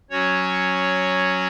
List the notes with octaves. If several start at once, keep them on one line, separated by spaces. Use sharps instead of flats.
F#3 C#4 F#4 C#5